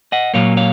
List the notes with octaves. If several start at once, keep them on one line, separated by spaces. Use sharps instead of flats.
D#5 F#5
A#2 F#3 A#3 C#5 F5
C#5 F5